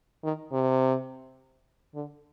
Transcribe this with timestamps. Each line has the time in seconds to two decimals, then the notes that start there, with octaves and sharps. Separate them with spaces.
0.23 D#3
0.52 C3
1.95 D3